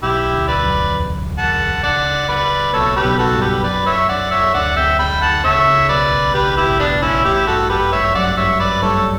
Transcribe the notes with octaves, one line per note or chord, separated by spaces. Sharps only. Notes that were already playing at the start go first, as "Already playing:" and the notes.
B1 B2 E4 G4
D2 D3
B4 D5
F#2 F#3
E2 E3
F#5 A5
C#2 C#3 D5 F#5
B4 D5
B1 B2 A4 C#5
G4 B4
B1 B2
F#4 A4
G2 G3
G4 B4
F#2 F#3 B4 D5
C#5 E5
D5 F#5
C#5 E5
D2 D3 D5 F#5
E5 G5
G5 B5
F#5 A5
C#2 C#3 C#5 E5
C#2 C#3
B1 B2 B4 D5
A1 A2
A1 A2 G4 B4
E4 G4
G2
G3 B3 D4
B1 B2
C#4 E4
A1 A2 E4 G4
G2 F#4 A4
F#2 G4 B4
G2 C#5 E5
G3
F#2 F#3 D5 F#5
G2 G3 C#5 E5
B4 D5
G2 G3 A4 C#5